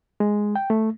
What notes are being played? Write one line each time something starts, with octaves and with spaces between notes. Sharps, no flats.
G#3
G5
A3